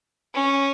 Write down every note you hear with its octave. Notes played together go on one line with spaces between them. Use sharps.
C#4